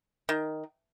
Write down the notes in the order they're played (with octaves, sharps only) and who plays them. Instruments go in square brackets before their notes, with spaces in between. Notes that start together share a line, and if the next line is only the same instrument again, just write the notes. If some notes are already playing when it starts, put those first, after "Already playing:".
[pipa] D#3